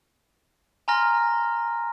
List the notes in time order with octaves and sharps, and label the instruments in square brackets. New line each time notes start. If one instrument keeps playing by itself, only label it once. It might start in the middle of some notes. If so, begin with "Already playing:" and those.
[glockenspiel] G#5 A#5 C6 F6 A#6